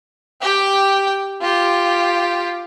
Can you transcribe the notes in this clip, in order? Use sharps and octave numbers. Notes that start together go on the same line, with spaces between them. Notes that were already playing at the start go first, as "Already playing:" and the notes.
G4 G5
F4 G4